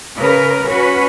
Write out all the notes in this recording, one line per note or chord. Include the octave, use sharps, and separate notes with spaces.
C#3 A#4 B4
C#4 F#4 B4